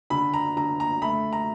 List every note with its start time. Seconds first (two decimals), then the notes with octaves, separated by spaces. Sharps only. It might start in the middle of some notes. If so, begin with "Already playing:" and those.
0.10 D3 B5
0.34 A#5
0.57 D3 A#5
0.80 A#5
1.02 A3 B5
1.33 A#5